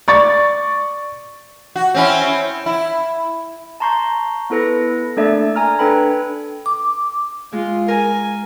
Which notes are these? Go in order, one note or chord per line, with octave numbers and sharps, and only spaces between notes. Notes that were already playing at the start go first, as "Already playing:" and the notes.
D5 C#6 A6
F#4
C4 C#4 E4
E4
A5 A#5 C6 C#6 G6
B3 E4 A4 B4 A#6
A3 A#3 D4 A4 D5 E5
G#5 A#5 F6
D4 A4 B4 G5 B5
D6
G#3 F4
A#4 G#5